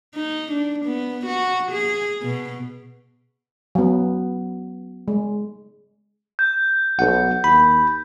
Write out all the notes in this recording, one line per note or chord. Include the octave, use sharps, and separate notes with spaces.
D#4
D4
B3
F#4
G#4
B2
F#3 B3
G#3
G6
B1 F#5
D#2 B5